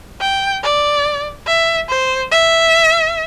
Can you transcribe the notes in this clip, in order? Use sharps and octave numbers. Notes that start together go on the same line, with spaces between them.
G5
D5
E5
C5
E5